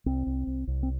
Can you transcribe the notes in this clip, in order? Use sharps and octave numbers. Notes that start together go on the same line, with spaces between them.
C2 C4
C2
C2
C2
C4